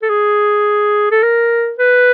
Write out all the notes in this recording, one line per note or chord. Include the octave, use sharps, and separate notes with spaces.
A4
G#4
A4
A#4
B4